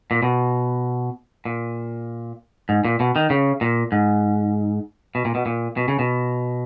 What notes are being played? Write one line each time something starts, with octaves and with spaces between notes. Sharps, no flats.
A#2
B2
A#2
G#2
A#2
B2
D#3
C#3
A#2
G#2
B2
A#2
B2
A#2
B2
C#3
B2